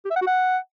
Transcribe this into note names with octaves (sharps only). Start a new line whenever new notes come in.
G4
E5
F#5
F#4
F#5